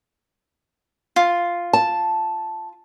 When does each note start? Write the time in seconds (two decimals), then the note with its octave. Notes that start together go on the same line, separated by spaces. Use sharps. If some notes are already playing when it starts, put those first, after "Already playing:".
1.16 F4
1.73 A5